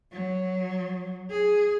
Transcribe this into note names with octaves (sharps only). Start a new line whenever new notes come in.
F#3
G#4